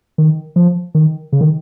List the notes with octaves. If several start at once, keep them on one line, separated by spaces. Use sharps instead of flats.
D#3
F3
D#3
C#3
D#3